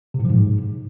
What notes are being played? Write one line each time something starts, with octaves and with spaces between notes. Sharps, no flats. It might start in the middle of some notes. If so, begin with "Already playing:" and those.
C3
A2
F3
G#2